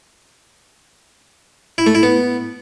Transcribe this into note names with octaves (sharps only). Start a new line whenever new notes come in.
E4
A3
E4
B3